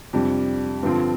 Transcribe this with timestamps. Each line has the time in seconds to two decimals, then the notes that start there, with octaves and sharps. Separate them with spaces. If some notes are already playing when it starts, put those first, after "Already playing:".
0.13 F2 C3 G3 D4
0.83 G2 D3 F3 C4 F4